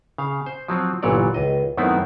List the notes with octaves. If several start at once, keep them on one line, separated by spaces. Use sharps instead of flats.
C#3 F5
C5
F3 F#3 C4
G1 A#2 E3 F#3 C#5 D5
C#2 D#5
F#2 D#3 A3 B3 C4 E4